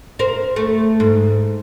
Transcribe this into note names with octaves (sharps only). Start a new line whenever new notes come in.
A#4 C5
A3
G#2